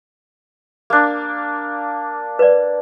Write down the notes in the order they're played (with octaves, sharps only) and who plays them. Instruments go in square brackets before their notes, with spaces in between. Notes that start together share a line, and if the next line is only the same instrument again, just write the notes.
[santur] A#3 D4
[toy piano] B4 D5